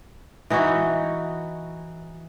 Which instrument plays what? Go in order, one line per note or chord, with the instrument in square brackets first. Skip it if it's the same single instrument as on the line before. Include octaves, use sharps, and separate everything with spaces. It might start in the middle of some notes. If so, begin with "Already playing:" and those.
[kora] E3 D#4 E4 F#4